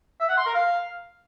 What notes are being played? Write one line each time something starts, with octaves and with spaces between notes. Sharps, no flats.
E5
F#5
C6
A#4
F5